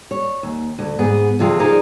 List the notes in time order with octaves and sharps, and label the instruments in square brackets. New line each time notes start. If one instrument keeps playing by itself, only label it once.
[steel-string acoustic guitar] C#5
D#2
D2
G#2 B3 G#4
D2 G2 C3 F3 F4 G#4
D#4 G#4 A#4 C5 D5